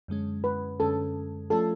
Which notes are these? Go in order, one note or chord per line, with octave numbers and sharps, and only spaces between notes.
F#2 D3 G#3 C#4
B4
F#2 D3 G#3 C#4 A4
F3 A3 C#4 F4 A4